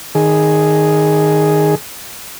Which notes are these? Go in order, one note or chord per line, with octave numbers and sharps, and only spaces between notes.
D#3 G#4